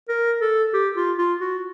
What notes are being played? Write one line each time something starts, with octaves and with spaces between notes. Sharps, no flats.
A#4
A4
G4
F4
F4
F#4